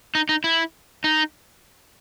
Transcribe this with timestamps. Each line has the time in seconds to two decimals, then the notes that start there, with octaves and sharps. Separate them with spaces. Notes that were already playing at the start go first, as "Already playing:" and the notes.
0.15 D#4
0.29 D#4
0.44 E4
1.04 D#4